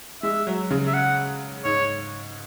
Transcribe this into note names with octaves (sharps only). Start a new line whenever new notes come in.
G#3 E5
F#3
C#3
E5
F#5
G#2 C#5